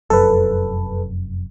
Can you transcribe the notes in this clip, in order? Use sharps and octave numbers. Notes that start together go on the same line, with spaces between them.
F1 F#2 A4 B4